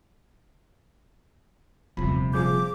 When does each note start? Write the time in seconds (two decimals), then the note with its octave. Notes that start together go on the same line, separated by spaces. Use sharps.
1.97 D#1 E2 C3 F3 B5
2.34 F3 G#4 D6 G6